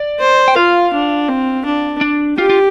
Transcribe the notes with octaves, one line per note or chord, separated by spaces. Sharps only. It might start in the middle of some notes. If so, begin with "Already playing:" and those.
Already playing: D5
C5
G5
F4 F5
D4
C4
D4
D4
F4 G4
F4